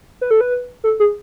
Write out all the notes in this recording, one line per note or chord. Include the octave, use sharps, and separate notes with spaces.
B4
A4
B4
A4
G#4